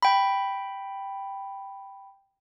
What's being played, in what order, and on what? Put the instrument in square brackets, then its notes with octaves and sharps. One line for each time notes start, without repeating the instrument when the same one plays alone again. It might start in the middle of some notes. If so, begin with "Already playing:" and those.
[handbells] G5 B5